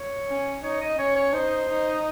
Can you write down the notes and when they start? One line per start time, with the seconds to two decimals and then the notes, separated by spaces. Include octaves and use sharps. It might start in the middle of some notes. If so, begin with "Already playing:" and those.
Already playing: C#5
0.28 C#4
0.63 D#4 C#5
0.81 D#5
0.98 C#4 C#5
1.16 C#5
1.33 D#4 C5
1.69 D#4